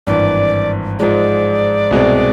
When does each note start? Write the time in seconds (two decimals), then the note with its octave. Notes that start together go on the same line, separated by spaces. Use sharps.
0.07 G#1 G2 E3 D5
0.99 G#2 F3 G#3 D5
1.91 C2 B2 G#3 C4